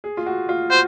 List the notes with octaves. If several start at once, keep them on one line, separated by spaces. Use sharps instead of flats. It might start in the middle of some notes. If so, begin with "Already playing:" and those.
G#4
F4
F#4
F4
F#4 C5